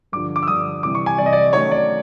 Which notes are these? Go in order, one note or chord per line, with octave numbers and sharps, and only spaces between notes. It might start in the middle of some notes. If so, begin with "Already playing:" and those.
G2 D3 F3 D6
D6
E6
G2 D3 F3 D#6
C3 E3 G3 D6
C#6
G#5
C3 E3 G3 D5
D#5
D5
D#3 F#3 A3 C#4 C#5
D5